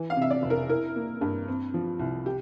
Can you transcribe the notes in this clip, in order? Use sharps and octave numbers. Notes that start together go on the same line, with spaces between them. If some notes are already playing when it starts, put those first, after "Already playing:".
Already playing: E3
F5
C3 E5
D5
F1
A#4
E4 A#4
A#3
G2
C4
F3
C2
G4